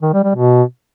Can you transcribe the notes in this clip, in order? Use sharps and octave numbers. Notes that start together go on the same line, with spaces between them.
D#3
G3
G3
B2